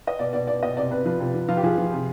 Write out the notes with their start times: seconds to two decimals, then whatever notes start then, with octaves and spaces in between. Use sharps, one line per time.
0.07 D#5
0.19 B2 D5
0.33 B2 D5
0.47 B2 D5
0.63 B2 D#5
0.77 C3 D5
0.91 C3 B4
1.05 F3 B4
1.20 C3
1.34 F3
1.48 F3 F4
1.57 G4
1.63 F3 G#4
1.78 F3
1.93 C3